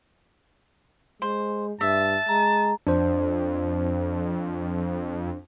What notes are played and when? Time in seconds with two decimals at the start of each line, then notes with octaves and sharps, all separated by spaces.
1.22 G#3 C5
1.81 G2 E5 A5
2.29 G#3 A#5
2.87 F2 D4 C5